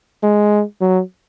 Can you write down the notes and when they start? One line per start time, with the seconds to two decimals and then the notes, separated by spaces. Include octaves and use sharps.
0.23 G#3
0.81 F#3